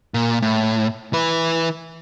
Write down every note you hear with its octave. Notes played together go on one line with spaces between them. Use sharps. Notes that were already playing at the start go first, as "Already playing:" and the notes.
A#2
A2
E3 B4